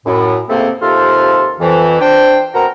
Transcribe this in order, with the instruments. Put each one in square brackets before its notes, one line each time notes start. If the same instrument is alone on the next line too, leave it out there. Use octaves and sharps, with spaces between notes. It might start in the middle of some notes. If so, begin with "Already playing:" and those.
[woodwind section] F#2 A2
C#2 C3 A3 A#3 C4
D#2 C3 F3 A4 F5 C6
F2 E3
D4 C5 G5
B2 C4 F#4 A#4 A#5